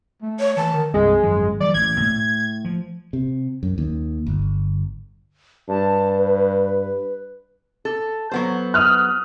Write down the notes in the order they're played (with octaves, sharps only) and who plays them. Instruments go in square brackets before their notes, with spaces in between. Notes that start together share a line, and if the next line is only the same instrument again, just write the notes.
[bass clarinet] A3
[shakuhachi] C#5
[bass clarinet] E3 [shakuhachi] A5
[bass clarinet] D#3
[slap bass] C2 G2 [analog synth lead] G#3
[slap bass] G#1 F#2 F3
[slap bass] E3 F#3 G3 [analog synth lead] D5
[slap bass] A1 [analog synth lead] G#6
[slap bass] A2
F3
[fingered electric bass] C3
F#2
D#2
G1
[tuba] G2 [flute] A5
[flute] B4
[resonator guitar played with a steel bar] A4
F#3 B3 C5
[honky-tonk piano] D#6 F6 F#6